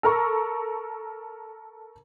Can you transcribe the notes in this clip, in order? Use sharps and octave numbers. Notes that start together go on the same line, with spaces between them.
A4 A#4 A#5 C#6